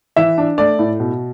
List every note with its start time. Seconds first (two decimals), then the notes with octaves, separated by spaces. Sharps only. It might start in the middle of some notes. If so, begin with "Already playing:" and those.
0.16 E3 E5
0.38 D4
0.58 A3 D5
0.79 A2
1.00 B2